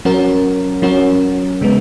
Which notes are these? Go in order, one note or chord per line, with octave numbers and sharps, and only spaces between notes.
F#3 C#4 F#4 A#4
F#3 C#4 F#4 A#4
C#3 G#3 B3